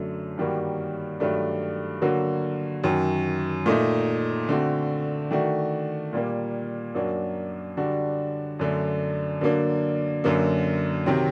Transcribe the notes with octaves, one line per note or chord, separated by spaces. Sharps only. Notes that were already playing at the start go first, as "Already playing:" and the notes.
Already playing: F#2 D3 F#3 A3
G2 D#3 G3 A#3 F#4
G2 D#3 F#3 A3 D4
D3 F#3 A#3 F#4
F#2 D#3 F#3
A#2 A3 D#4
D3 A3 C4 F#4
D#3 A3 D4 F#4
A#2 G3 A#3
F#2 F#3 A#3 D4 F#4
D3 G3 D4 F#4
F#2 D3 A3 D4
D3 F#3 A#3 D4
F#2 D3 F#3 A#3
C3 D#3 F#3 C4